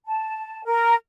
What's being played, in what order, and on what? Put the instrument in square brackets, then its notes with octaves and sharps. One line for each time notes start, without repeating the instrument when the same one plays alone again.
[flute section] A5
A#4